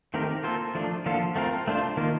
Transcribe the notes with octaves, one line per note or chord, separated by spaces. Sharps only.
D#3 A3 C4 G4 A#4
A#3 F4 A4 C5
F3 A3 D4
D3 F3 A#3 F4 A4
A3 C4 F4 A#4
A3 D4 F4 C5
D#3 A#3 F4